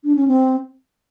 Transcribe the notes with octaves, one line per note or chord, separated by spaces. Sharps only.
D4
C#4
C4